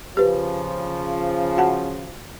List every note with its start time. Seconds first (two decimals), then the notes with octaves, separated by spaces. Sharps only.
0.17 C#3 F3 G4 B4
1.57 F#4 F#5 A5